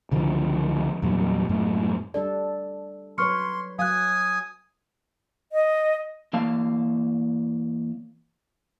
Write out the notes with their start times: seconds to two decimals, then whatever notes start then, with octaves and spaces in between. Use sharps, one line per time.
0.11 C#2 D3 E3 F3
1.02 E2 A#2 F#3 G3
1.49 F#2 A2 G#3 B3
2.14 G3 D4 A4 D5
3.18 F#3 B4 C#5 C6 C#6 F6 C#7
3.79 F#3 F5 G#5 D#6 F#6
5.52 D#5
6.33 E2 A#3 F5 A5